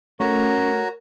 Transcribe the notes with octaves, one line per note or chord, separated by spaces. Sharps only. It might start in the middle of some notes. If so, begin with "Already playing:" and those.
A3 C#4 F#4 A#4 C#5 A#5